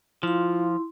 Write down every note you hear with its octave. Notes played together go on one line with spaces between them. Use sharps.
F3 E4 F4 C6